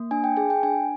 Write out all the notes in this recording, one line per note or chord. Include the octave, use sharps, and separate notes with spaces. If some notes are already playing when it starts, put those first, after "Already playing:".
Already playing: A#3
D4 G#5
G5
G#4 G#5
G5
D4 G#5